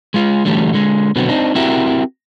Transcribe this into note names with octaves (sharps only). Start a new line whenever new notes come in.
G#3 F4
D3 E3 F#3 G3 A3 G4
D3 G#3
B2 D3 F#3 B3 C4
C4 D4 D#4
C4 E4 F#4 G4 A#4 E5